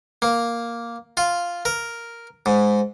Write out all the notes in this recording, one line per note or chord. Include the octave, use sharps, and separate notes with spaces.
A#3
F4
A#4
G#2